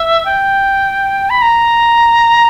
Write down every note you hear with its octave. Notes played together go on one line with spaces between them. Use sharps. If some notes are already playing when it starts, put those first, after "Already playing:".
Already playing: E5
G5
B5
A#5